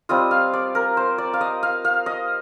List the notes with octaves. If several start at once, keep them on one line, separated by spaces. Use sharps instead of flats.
G3 C4 F4 D#5
F5
D5
A#4
C5
D5
F5
D#5
F5
F5
D#5